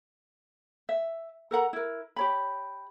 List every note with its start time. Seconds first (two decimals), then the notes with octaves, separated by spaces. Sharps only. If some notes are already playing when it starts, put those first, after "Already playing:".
0.89 E5
1.51 A4 A#4 F#5 A#5
1.73 E4 A#4
2.16 G4 C#5 B5